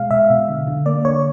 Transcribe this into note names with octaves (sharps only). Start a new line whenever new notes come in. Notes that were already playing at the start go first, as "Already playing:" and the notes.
Already playing: B2 G#3 F5
B2 E5
B2
D3
D3
A#3 D5
D3 C#5